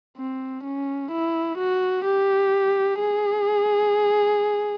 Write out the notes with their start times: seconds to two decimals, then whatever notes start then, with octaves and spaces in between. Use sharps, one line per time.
0.17 C4
0.64 C#4
1.11 E4
1.58 F#4
2.05 G4
3.00 G#4